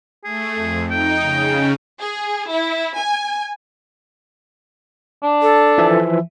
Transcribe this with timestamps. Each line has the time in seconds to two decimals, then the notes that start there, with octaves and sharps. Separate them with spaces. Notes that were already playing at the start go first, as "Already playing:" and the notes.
0.24 A3 G#4
0.55 F2
0.91 D#4 G5
1.22 C#3
2.01 G#4
2.50 E4
2.97 G#5
5.23 D4
5.42 A4
5.78 E3 F3 E5